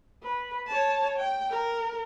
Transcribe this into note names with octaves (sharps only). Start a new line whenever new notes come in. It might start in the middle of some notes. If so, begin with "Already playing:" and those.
B4
C#5 A5
G5
A#4